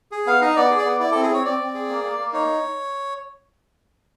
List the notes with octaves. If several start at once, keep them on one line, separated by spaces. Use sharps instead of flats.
G#4
B3 F5
D#4 D#5
B3 D5
G#4
D5
B3
E4 D5
C4 A4
G#4
C4 C#5
C4 D5
C4
G#4
A#3
A#3
A#3
D#4 C#5